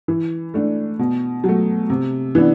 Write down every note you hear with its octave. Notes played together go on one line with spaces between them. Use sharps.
E3
A3 D4
B2
F#3 A3
C3
E3 B3 D4